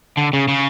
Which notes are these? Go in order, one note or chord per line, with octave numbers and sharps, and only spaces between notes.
D3
C#3
C#3